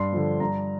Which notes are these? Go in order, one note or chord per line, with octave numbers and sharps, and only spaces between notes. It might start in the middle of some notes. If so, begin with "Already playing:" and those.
Already playing: G2 C6
D3 F3
G2 A#5